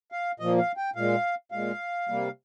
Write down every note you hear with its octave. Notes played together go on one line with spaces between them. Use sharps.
F5
A#2 F3 A#3 D#5
F5
G5
A#2 G#3 F5
A#2 G#3 F5
C3 G3 A#3